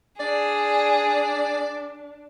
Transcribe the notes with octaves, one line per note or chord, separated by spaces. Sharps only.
D4 G#4 D5